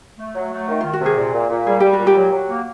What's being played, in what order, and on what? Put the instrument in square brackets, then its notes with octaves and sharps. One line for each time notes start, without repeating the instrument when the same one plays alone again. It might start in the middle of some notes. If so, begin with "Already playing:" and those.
[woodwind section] A3
F#3
A3
D#3
[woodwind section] D#3 [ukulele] F4
[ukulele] F#4
[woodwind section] C3 [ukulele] G#4
[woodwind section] A#2
A#2
A#2
[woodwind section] G3 [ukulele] G#4
[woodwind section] G3 [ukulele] G4
[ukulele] F#4
[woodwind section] A#2
[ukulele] G4
[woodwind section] F#3
F#3
A#3